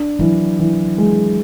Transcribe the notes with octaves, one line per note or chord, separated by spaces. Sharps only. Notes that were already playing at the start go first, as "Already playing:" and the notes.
Already playing: D4
E3 F#3
E3
G#3